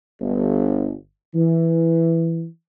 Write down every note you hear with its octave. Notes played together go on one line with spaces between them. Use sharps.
G1
E3